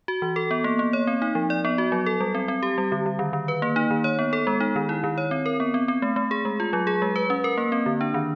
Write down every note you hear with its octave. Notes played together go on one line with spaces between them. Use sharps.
F#4
E3
A4
B3
A#3
A#3
C#5
C4
D#4
F3
D5
B3
F#4
F#3
A4
G3
C4
C4
G4
G3
D3
D3
D#3
D#3
B4
A#3
D#4
D#3
C#5
B3
A4
G#3
D#4
D#3
E4
D#3
C#5
C4
A#4
B3
C4
C4
A3
A3
G#4
G#3
F4
F#3
G#4
G#3
B4
C#4
A#4
A#3
C4
D3
D4
D#3